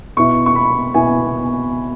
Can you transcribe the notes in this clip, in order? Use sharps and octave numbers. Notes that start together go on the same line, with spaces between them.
B2 B3 E4 C#6
C#6
B5
B2 B3 E4 G#5